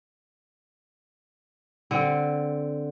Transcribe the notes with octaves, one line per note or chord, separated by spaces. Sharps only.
D3 C4